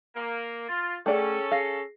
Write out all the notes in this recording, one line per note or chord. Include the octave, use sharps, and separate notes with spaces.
A#3
F4 A6
A3 C#4 G#4 A4 D5 F#5 G5
G#4 F5 A#6 C7